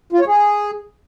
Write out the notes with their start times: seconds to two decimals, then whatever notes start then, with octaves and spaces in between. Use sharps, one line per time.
0.12 F4
0.20 C#5
0.27 G#4